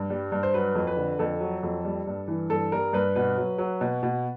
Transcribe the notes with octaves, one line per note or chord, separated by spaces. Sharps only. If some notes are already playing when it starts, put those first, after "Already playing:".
Already playing: G2
G3
G2
C5
F#3 B4
F2
B4
D3
F2 A4
F#3
F2
G3
G2
E3
G2 A4
G3 A#4
G2 B4
B2 B4
F#3
F#3
B2
B2